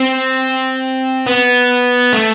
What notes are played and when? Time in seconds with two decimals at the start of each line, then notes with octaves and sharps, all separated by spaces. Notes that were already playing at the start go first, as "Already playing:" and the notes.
Already playing: C4
1.26 B3
2.13 A3